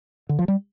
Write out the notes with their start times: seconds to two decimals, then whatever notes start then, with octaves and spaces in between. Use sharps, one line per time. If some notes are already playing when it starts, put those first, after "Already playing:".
0.29 D3
0.39 F3
0.48 G3